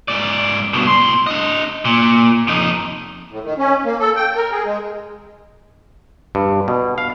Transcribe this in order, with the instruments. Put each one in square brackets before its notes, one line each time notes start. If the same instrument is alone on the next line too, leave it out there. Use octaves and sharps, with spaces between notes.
[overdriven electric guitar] G#2 D5
G2 B2
A2 C6
D4 D#5
A#2
F2 D#4
[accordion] A2
D#3
C#4
A#3
A4
G5
A#4
G#4
G#3
[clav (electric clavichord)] G2
B2
F5